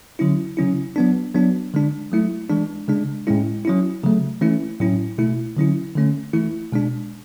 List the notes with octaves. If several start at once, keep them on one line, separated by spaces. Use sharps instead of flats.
D3 F#3 C#4 E4
C#3 F#3 C#4 E4
F#3 B3 D4
F#3 B3 D4
D3 G#3 D4
F#3 A3 E4
E3 G#3 D4
C#3 G#3 D4
A2 G#3 C#4 E4
F#3 C#4 E4
C#3 F#3 A3
E3 A3 C#4 E4
A2 F#3 C#4 E4
B2 A3 E4
D3 F#3 C#4 E4
D3 A3 C#4
E3 A3 E4
B2 G#3 D4